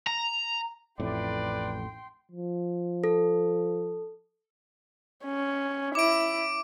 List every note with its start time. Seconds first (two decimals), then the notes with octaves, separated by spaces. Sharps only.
0.07 A#5
1.00 A1 F2 A2 B4 D5 G5 C6
2.31 F3
3.04 A4
5.25 C#4
5.95 E4 D6 D7